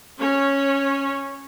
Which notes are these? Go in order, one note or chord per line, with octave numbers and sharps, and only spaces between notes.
C#4 C#5